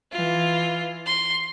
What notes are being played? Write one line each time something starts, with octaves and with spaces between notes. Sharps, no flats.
E3 F4
C6